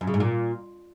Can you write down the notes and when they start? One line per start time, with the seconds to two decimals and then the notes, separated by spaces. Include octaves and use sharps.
0.01 F#2
0.07 C#3
0.14 G#2
0.20 A#2